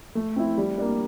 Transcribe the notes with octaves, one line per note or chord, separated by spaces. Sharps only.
A3
C4 E4
G3
A#3 D4